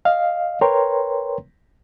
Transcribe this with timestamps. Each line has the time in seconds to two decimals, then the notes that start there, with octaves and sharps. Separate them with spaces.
0.05 D#5 F5
0.61 A#4 B4 C#5 G5 A#5 C6